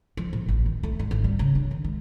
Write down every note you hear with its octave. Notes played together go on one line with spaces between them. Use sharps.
F3
A#2
A1
D#3
A3
G#2
G#1
G3
C#3
D4
D#3
G#3